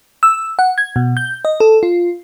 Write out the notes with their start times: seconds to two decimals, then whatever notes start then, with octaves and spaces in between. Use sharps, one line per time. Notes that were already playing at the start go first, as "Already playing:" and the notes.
0.23 E6
0.59 F#5
0.78 G#6
0.96 B2
1.17 G6
1.45 D#5
1.60 A4
1.83 F4